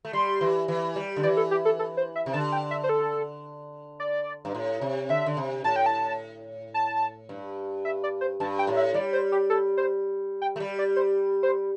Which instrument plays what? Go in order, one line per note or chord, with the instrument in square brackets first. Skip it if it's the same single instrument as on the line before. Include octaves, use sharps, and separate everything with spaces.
[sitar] A3
[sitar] G3 [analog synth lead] C6
[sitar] E3
E3
G3
D3
[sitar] E3 [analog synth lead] D5
[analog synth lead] A4
G4
A4
A4
C5
E5
[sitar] C3
[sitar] D3 [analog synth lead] A5
[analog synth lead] G5
E5
C5
A4
D5
[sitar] G2
A2
C3
[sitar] D3 [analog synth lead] E5
[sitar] D3
C3
[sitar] A2 [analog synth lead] A5
[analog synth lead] G5
A5
A5
[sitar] G2
[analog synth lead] E5
D5
C5
[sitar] G2 [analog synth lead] A5
[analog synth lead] G5
[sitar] A2
[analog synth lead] E5
[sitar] G3 [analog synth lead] D5
[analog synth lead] C5
G4
A4
C5
G5
[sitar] A3
G3
[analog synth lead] D5
C5
C5